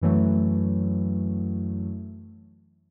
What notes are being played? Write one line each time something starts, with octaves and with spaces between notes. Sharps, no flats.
F#2 E3 F#3 A3